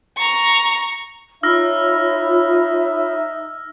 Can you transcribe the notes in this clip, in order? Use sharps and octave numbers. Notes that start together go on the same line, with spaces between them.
A#5 C#6
D#4 F4 C#5 E5 B5 E6 F6 A#6